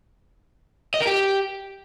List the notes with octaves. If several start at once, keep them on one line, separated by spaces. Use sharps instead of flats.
D#5
A#4
G4